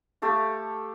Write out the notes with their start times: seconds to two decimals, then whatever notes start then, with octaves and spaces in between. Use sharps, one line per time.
0.22 A3 G4 A4 F5